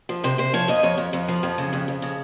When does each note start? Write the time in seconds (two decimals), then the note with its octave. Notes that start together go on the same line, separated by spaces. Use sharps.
0.09 F3
0.24 C3 C5
0.38 C3 C5
0.54 F3 C#5
0.68 F2 D#5
0.83 F2 C#5
0.98 F2
1.13 F2
1.28 F3
1.43 F2
1.58 C#3
1.73 F2
1.88 F2
2.02 C#3